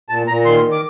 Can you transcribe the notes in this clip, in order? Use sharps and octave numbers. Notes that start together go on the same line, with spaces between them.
A#2 A5
A#2 A#5
D#3 C6
D#3
D6